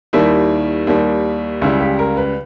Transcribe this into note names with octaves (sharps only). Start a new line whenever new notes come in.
D#2 D#3 G3 E4
D#2 D#3 G3
C#2 C#3 G3 E4
G4
A#4
B4